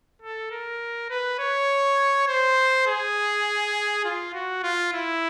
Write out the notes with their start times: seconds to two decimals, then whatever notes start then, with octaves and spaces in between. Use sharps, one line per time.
0.22 A4
0.51 A#4
1.10 B4
1.39 C#5
2.28 C5
2.87 G#4
4.05 F4
4.34 F#4
4.63 F4
4.93 E4